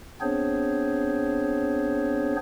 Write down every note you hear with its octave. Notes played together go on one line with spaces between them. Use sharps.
B3 C4 D4 G#4 C5 C#5